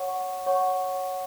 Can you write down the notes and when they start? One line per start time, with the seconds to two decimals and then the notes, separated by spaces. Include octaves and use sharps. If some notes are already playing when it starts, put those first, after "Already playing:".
Already playing: C#5 F#5 C#6
0.46 C#5 F#5 C#6